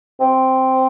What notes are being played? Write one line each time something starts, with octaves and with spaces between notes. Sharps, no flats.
C4